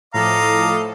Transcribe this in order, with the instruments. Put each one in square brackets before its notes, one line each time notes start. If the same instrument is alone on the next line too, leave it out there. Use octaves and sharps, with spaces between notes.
[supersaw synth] A2 F3 A4 [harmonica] D#5 F5 D6 [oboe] A#5